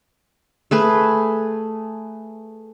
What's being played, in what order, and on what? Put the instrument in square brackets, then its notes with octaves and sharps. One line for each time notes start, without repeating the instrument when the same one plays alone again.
[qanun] A3 G#4 B4